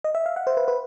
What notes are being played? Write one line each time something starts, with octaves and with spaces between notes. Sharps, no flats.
D#5
E5
F5
F#5
C5
B4
B4